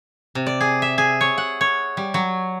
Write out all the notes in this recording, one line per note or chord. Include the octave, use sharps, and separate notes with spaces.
C3
D5
G#4
E5
G#4
C#5
F#5
C#5
G3
F#3